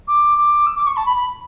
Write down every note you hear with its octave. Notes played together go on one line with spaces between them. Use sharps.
D6
D6
E6
D6
C#6
A5
B5
B5